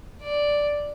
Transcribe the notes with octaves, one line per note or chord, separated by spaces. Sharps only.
D5